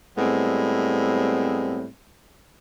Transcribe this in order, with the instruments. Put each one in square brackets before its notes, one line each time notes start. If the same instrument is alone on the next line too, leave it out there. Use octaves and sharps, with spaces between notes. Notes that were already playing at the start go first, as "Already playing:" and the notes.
[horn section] A2 G3 G#3 B3 C4